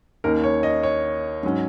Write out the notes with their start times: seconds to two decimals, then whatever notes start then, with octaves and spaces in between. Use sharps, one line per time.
0.24 D#2 D#3 A#3 C#4 A#4
0.44 C#5
0.63 D#5
0.83 C#5
1.43 G#2 F#3 C#4